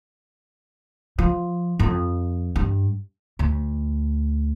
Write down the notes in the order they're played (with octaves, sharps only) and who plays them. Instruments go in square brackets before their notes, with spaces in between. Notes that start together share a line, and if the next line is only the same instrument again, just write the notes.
[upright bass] F3
F2
G2
D2